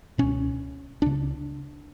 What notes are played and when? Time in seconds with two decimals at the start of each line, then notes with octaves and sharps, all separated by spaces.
0.18 C#2 B2 C#4
1.02 C#2 C#3 D4